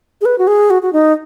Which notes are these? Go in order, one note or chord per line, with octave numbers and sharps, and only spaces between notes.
G#4
B4
F#4
G#4
F#4
F#4
D#4